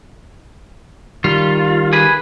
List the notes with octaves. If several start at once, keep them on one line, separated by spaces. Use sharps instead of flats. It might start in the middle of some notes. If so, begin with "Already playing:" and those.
D#3 G3 F4
G#4 B4